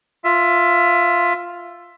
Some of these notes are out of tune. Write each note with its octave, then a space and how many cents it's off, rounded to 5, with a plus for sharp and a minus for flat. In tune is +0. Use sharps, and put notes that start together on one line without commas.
F4 +0 E5 +15